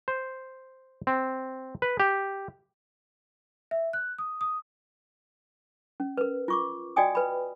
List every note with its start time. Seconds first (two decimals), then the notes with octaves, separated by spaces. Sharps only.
0.08 C5
1.07 C4
1.82 B4
2.00 G4
3.71 E5
3.93 F#6
4.18 D#6
4.41 D#6
6.00 C#4
6.17 A#4 B4
6.48 F4 C#6 D6
6.96 F#4 D5 D#5 G5 G#5 D#6
7.15 B4 B5